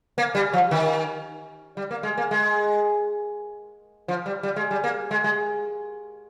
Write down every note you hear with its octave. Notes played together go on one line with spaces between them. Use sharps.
A#3
G3
F3
D#3
G3
A#3
G#3
A#3
G#3
F3
G3
G3
G#3
G3
A#3
G#3
G#3